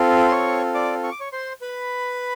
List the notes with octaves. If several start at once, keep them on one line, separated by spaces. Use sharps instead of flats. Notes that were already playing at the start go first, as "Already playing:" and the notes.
Already playing: C4 F4 A4
C6
C#5 C#6
D5 D6
C#6
D6
C#5 C#6
C5 C6
B4 B5